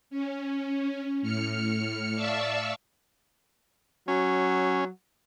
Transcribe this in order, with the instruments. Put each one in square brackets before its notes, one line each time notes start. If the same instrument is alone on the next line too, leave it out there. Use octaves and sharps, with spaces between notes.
[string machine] C#4
A2 F6 C#7
D5 E5 F5 A5 C#6 E6
[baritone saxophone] F#3 [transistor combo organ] C#4